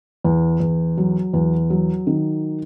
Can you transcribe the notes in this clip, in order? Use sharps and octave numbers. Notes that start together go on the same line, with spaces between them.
E2
E2
F#3
E2
F#3
D#3